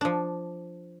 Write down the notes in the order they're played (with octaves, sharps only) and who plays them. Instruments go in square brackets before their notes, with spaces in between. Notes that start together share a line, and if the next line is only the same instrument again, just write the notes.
[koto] F3 D4